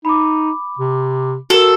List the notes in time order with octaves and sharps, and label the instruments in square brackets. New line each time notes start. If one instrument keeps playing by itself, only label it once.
[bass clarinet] D#4 [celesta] B5 D6
[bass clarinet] C3
[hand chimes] F#4 A#4 [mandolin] A4 [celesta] E7